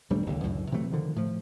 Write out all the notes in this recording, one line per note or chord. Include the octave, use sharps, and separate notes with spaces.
D#1 G3 A3 D4
F#1 D#2 D3
C#2 F#2 A2 D3
C3 E3 F#3 A3
D3 D#3 F3
A2 F3